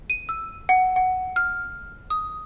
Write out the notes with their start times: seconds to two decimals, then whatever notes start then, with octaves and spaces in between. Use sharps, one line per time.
0.10 D#7
0.29 E6
0.69 F#5
0.96 F#5
1.36 F6
2.10 D#6